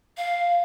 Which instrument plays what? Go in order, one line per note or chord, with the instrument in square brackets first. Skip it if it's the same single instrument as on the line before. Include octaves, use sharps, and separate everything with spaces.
[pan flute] F5